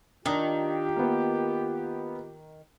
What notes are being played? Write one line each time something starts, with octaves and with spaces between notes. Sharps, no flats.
D#3 D4 F4 G4 D#6
A#3 B3